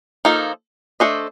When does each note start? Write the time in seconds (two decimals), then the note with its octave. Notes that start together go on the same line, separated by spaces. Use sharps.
0.25 F3 A#3 D#4 A4
1.00 A3 D4 A4 C5 D#5